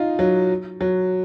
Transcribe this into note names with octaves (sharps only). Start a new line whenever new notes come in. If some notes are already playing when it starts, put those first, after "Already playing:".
Already playing: D#4 F4
F#3
F#3